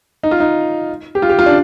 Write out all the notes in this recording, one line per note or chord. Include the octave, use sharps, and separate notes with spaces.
D#4
F4
D#4
G4
F4
G4
F4
D4